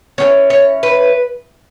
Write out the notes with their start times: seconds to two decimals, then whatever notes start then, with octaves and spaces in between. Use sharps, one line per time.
0.18 E3 G#3 C#4 C#5
0.50 C#5
0.83 B4